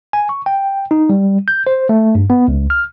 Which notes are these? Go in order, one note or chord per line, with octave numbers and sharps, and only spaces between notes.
G#5
C#6
G5
D#4
G3
G6
C5
A3
G2
B3
C#2
F6